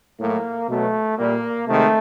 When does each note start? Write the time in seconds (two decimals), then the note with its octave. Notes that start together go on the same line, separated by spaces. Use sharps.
0.20 A2 F#3 A#3
0.69 B2 F#3 A3
1.18 A#2 G3 A#3
1.67 C3 D#3 G#3 A3